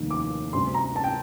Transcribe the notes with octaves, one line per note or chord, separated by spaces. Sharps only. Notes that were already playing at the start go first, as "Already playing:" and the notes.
Already playing: F1 D#2 D#3 G3
D6
D2 C3 G3 C6
A#5
A5
G5